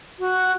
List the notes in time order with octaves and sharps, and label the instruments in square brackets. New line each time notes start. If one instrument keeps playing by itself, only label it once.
[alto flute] F#4